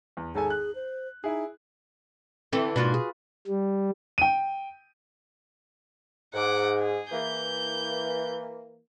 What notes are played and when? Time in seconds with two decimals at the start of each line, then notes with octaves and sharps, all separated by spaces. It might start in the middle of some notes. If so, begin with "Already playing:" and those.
0.17 E2
0.35 G#1 G#4 A4 G#5
0.50 F#6
0.75 C5
1.24 D#4 E4 G#4
2.53 D3 E3 C4 A4
2.76 G#2 B2 A#3 D4 F4 F#4 B4
2.94 G#4
3.47 G3
4.18 G5 D#7
6.34 G#2 F#5 D6
6.79 G#4
7.12 E3 A#3 G6